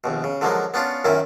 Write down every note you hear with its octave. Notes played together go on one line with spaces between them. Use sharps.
A#1 D#2 B2
C#3
D3 F3 F#3 G#3 A#3
B3 C#4 D4 F4
F#2 A#2 D#3 C#4 E4